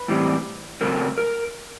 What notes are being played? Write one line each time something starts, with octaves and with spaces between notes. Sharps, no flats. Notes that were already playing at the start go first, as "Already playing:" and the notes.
Already playing: B4
A2 E3 G3 C4
C#3 F#3 A3 C4 A#4
A#4